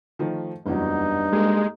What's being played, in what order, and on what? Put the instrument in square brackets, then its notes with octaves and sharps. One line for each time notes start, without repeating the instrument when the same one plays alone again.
[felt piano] D#3 F3 A3
[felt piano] F#1 E2 F#3 [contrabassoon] G2 [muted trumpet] D#4
[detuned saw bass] G#3 [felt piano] A#3 G4 A4